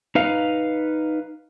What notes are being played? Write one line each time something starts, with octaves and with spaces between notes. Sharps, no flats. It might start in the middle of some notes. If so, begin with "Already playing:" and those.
D#4 B4 F5